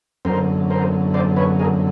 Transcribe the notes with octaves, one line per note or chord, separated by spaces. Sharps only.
F#2 D3 A#4 C5
A#4 C5
C5 D5
B4 C#5
G#4 A#4